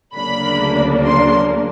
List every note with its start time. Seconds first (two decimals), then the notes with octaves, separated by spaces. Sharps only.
0.16 D2 C#3 F#3 A#3 D4 B5
1.05 C6